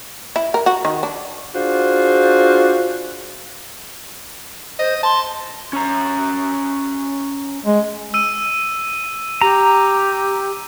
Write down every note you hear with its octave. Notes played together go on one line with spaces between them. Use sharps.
E4
A#4
F#4
D#3
D4
D4 F4 F#4 G#4 C5
C5 D#5
A5 C6
C#4 C#5 A#5
G#3
E6 D#7
G4 A#5